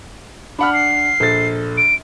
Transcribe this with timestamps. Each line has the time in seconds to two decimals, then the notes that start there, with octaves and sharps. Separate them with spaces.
0.59 D4 F#5 B5 F6
0.73 C7
1.20 A#1 A4 A6
1.77 D7